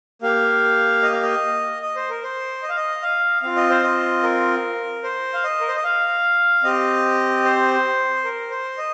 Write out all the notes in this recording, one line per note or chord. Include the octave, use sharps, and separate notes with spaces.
A#3 G4 F5
D#5
F5
D#5
D#5
C5
A#4
C5
D#5
F5
D#5
F5
C4 F4 F5
D#5
C5
D#5
A#4
C5
F5
D#5
A#4
C5
D#5
F5
C4 G4 D#5
C5
A#4
C5
D#5